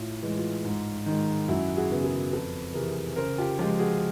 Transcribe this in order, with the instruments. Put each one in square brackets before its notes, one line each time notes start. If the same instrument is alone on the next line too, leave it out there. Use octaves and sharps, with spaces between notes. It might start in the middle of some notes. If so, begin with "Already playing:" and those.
Already playing: [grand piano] A2 F4
E3 G#3
F4
G#2
D#3 G#3
F#2 E4 F#4
F#4 G#4
C#3 F#3 B3
G#4 A#4
F2 A4 B4
C3 E3 G#4 A#4
C#3 A#4 C5
F4 G4
F3 G#3 F4 G4
F#4 G#4